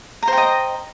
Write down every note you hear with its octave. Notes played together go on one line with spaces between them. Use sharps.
C5 D#5 G5 A#5